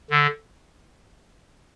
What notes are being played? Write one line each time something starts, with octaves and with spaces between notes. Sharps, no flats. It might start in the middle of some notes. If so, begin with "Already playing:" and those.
D3